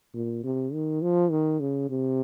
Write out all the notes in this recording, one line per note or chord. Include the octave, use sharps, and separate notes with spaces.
A#2
C3
D#3
F3
D#3
C#3
C3